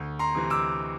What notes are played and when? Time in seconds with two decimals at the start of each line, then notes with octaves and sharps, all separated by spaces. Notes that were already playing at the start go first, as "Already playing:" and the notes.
Already playing: D2
0.19 A#5 C6
0.35 C3 E3
0.50 D6 E6